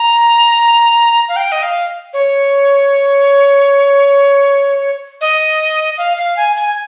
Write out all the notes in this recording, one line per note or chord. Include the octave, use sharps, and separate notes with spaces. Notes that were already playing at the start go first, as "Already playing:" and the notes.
Already playing: A#5
F5
G5
D#5
F5
C#5
D#5
F5
F5
G#5
G#5